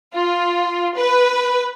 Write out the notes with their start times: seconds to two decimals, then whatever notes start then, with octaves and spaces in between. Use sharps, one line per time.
0.14 F4
0.98 B4